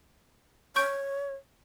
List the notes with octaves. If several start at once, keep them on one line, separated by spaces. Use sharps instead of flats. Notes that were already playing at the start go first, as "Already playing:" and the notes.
C#5 C#6 G6 D7